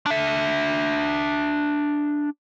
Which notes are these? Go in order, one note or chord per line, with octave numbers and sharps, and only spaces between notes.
D4 E5